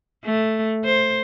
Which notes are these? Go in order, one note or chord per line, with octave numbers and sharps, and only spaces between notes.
A3
C5